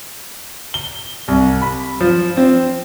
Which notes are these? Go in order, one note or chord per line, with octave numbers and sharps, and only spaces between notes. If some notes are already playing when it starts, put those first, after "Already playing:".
G7
C2
B5
F3
C4